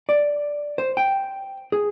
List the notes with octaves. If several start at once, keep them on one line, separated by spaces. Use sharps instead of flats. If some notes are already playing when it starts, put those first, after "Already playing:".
D5
C5
G5
G#4